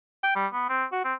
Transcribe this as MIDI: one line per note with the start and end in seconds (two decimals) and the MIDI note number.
0.23 0.32 79
0.36 0.47 55
0.53 0.68 59
0.69 0.85 60
0.92 1.01 66
1.04 1.14 60